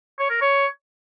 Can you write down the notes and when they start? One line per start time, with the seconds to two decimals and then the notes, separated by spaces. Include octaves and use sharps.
0.19 C#5
0.30 A#4
0.41 C#5